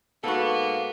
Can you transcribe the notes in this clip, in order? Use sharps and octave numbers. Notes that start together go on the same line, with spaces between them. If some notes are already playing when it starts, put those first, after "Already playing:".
G#2 A#3 B3 F#4 A4